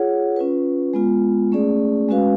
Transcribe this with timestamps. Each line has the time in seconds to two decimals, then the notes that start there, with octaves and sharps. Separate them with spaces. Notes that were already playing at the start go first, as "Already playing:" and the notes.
Already playing: F4 G#4 C#5 F#5
0.36 C#4 F4 B4
0.94 G#3 B3 F4
1.52 A3 C#4 G#4 D5
2.09 G#3 C#4 F#4 B4 F5